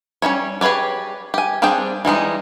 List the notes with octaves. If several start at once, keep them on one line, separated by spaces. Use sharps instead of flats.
G3 C#4 E4 C#5
G4 G#4 B4 C#5 D5
G4 G#5
G3 C4 D4 G#4 G5
E3 G3 G#3 D#4